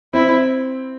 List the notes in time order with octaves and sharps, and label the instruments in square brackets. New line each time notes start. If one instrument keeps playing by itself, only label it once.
[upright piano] C4 [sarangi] E4